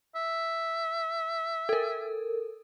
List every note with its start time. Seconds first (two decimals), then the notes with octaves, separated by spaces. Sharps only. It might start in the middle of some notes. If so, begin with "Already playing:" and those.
0.15 E5
1.69 A4 A#4